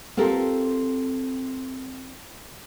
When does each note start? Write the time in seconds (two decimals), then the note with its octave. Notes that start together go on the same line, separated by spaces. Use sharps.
0.17 C4 F4 G4 A4 A#4